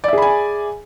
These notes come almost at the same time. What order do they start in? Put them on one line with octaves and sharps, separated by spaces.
D5 E5 G#4 B5 G#5